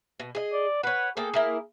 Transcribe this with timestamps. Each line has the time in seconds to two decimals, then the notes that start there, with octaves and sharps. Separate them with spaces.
0.20 B2
0.35 G#4 D#5
0.53 D5
0.83 B4 C#5 F#5
1.17 A#3 G#4 A4 G5
1.34 A#3 E4 A#4